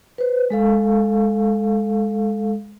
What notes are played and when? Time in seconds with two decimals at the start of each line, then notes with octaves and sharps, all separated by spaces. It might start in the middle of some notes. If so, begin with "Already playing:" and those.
0.18 B4 C5
0.50 G#3 A4 F5